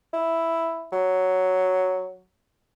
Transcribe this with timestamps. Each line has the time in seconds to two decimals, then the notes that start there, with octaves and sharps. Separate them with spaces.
0.13 E4
0.92 F#3